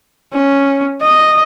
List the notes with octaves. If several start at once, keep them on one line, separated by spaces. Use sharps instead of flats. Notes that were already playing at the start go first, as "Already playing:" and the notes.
C#4
D#5